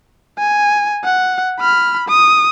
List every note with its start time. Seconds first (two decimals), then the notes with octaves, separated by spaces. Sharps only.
0.39 G#5
1.05 F#5
1.60 B5 F6
2.08 D#6